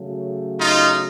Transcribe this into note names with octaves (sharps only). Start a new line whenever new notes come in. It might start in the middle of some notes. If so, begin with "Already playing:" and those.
Already playing: C#3 F#3 A3
D#4 F4